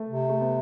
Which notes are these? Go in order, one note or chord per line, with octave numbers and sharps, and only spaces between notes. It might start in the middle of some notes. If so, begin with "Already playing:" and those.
Already playing: A3
C3
A3
B3